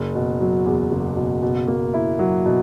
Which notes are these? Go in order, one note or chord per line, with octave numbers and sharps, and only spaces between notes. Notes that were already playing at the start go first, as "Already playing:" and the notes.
Already playing: F#1
B2
F#3
E2
F#1
B2
B2
A#3
E4
F#3
B2